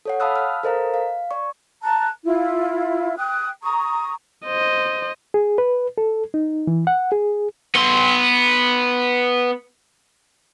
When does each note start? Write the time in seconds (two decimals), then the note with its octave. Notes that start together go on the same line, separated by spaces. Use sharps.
0.05 A4 C#5 F#5
0.20 F5 A5 B5 D#6 E6 F#6
0.36 F6
0.63 A4 A#4 C5 D#5 F5 A#5
0.94 F5
1.31 D5 C#6
1.83 A5 A#5 F#6
2.25 E4 F4
3.17 G5 D#6 F#6
3.62 A#5 C#6 D#6
4.46 C5 D#5
5.34 G#4
5.58 B4
5.98 A4
6.34 D#4
6.67 E3
6.87 F#5
7.12 G#4
7.75 B3 C6